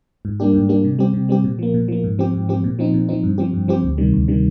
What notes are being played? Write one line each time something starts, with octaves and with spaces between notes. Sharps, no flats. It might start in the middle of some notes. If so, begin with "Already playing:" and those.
G#2
G3 A#3 D4 G4
G#2
G3 A#3 D4 G4
C3
G3 C4 G4
C3
G3 C4 G4
A#2
F3 A#3
A#2
F3 A#3
G#2
F3 C4 G4
G#2
F3 C4 G4
A#2
F3 C4 D#4
A#2
F3 C4 D#4
G2
F3 C4 G4
G2
F3 C4 G4
D2
C3 D#3 G3
D2
C3 D#3 G3